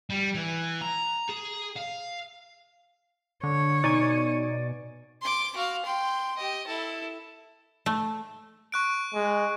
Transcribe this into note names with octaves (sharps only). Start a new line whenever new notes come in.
G3
E3
A#5
G#4
F5
D3 C#5
B2 D#4 D5 G#5 C#6
C6 D6
F#4 F5
G5 C6
G4 D#5
E4 A4
A3
C#6 F#6 D7
G#3